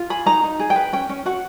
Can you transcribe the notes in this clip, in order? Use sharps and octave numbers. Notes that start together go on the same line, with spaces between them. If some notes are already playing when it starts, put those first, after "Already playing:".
Already playing: F4
G#4 B5
D#4 A#5
D#4
G#4
G5
B4
C#4 G5
C#4
F#4 F#5